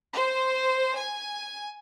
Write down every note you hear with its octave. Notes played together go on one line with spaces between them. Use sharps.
C5
G#5